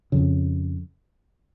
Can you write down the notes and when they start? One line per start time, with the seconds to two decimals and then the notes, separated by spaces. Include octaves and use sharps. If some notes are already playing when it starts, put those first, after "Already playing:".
0.12 F2 C#3